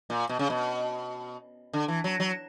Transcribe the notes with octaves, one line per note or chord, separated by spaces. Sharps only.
A#2
B2
C#3
B2
D3
E3
F#3
F#3